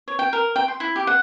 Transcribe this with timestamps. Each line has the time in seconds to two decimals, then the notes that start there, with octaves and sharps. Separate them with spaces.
0.08 C#5
0.19 G5
0.33 A#4
0.56 G5
0.68 C6
0.80 E4
0.96 G4
1.07 F#5